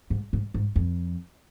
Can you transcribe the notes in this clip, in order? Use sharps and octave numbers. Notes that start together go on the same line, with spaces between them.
G#2
G#2
G#2
F2